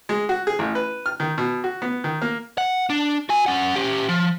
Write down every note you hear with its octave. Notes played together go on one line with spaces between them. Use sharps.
G#3
F#4
G#4
A1
B4
F6
D#3
B2
F#4
B3
D#3
A#3
F#5
D4
F#4 G#5
C#4 F#5
C#4 G4
F3